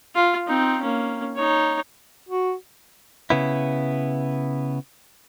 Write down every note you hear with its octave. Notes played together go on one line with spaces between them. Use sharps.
F4
C4 D#4
A#3 C#4
D#4 C#5
F#4
C#3 B3 E4